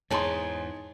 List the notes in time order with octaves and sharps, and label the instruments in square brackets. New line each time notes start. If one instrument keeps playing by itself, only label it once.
[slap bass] E2 G#2 [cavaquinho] D#4 G#4 A5 [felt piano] C#5 C6